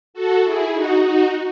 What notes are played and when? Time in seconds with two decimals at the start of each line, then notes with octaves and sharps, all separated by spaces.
0.14 F#4 A4
0.43 E4 G#4
0.73 D#4 F#4
1.02 D#4 F#4